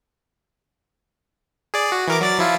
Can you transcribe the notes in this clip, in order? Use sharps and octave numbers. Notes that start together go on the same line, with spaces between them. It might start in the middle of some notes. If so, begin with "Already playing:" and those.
G#4 D5
F#4
E3 A#4 D6
F#3 D5 A6
F3 E4 F4